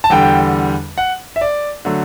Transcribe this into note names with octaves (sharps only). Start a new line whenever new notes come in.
A5
E2 D3 G3 G5
F#5
E5
D5
D3 F#3 A3